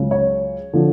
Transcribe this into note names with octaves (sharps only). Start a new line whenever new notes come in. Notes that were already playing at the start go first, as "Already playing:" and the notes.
Already playing: C#2 C#3 F#3
C#5
D3 F3